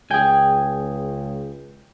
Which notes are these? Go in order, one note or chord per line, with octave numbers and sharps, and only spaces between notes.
C#2 G#4 G5 G#5